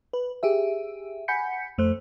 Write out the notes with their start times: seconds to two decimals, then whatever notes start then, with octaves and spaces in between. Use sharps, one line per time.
0.13 B4
0.43 G4 G#4 E5
1.28 F#5 G#5 B5 G6 B6 C#7
1.78 F2 A3 C5 F#6